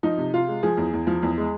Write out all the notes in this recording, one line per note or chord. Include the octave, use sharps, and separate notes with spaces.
F3 D#4
C3
C3 F4
G#3
F3 G#4
E2
E2
F3
E2
G#3